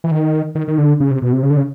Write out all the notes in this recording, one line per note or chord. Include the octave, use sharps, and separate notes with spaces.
E3
D#3
D#3
D#3
D3
C#3
C3
B2
C3
C#3
D3
C#3